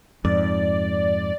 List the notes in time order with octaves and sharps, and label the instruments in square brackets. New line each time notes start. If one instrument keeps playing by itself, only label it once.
[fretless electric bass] F2 G#2 [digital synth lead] D5